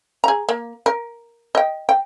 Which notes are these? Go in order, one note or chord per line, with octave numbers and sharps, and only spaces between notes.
G#4 A#5
A#3
A#4
D#5 G5
G5